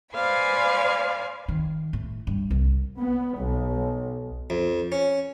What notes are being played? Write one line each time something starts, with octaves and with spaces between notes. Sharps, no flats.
B4 C5 D5 F5 G#5 B5
D#3
A2
G2
C2
B3
B1
F2
C#4